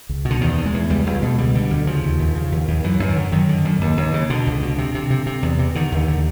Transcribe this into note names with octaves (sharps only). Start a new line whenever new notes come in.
C#2
B2
D3
E2 D#3
E2
G#3
E2
C#2 G3
C#2
B2
D3 G3
D3
D2
C#3 F3
D#2
D#2
C#3
D#2
D#2
F#2 E3
F#2
D#3
D3
F#2 D#3
D3
F#2
D#2
D#2
C#3
B2 D3
C#2
B2
C3
C3
C3
C3
E2
C3
D3 D#3
D#2
D3